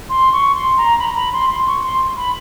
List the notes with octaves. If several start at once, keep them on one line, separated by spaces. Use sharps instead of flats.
C6
C#6
C6
A#5
B5
A#5
B5
C6
C6
C#6
C6
B5